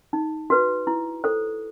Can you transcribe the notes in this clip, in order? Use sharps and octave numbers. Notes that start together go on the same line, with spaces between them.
D#4
F#4 B4
E4
A4 C5